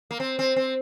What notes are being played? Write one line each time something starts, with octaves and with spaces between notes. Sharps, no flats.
A#3
C4
C4
C4